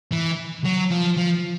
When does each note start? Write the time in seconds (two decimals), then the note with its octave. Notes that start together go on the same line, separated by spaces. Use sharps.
0.11 E3
0.64 F#3
0.90 F3
1.17 F3